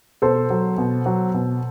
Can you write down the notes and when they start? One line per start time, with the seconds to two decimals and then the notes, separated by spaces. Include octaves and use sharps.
0.22 B2 A4 C5
0.50 F#3
0.78 B2
1.06 F#3
1.34 B2